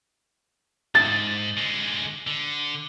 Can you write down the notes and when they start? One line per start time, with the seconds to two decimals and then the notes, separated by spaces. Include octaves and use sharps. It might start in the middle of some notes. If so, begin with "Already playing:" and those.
0.95 D2 G#2 A6
1.57 D3 G#3
2.27 D3